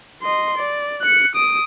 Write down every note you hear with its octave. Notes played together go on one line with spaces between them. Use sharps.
D#5 C6
D5
F#6 C#7
D#6 D7